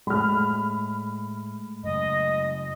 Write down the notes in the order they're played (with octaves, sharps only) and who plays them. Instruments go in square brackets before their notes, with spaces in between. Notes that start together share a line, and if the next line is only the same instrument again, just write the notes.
[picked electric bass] A2 [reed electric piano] G#3 A3 [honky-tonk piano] B5 F6
[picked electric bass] F#2 C#3 [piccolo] D#5